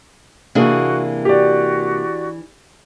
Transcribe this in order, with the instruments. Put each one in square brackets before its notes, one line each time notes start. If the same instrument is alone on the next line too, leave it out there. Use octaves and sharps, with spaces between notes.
[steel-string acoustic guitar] C3 A#3 [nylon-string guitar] E3 D4 G#4 [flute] F#4
[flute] F#4 [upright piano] G4 D5